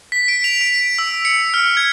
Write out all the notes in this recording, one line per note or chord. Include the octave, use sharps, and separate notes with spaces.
B6
D7
F7
D7
E6
C#7
F6
G#6